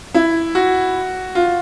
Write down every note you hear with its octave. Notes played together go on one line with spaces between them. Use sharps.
E4
F#4
F4